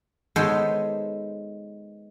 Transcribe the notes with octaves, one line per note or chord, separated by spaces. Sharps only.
G#3 B3 D#4 A4 C5 C#5